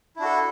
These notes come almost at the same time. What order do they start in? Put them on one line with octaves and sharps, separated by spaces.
E4 D4 F#4 A4